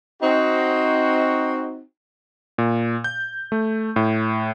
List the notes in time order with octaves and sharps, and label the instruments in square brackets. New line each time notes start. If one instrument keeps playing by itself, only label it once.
[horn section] C4 D#4 F#4
[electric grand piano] A#2
G6
A3
A2